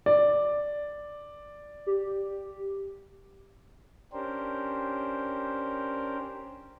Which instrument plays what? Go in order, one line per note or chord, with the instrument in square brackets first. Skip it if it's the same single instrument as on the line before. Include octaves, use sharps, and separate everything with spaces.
[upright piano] D5
[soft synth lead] G4
[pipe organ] C#4 D4 G4 A#4 C5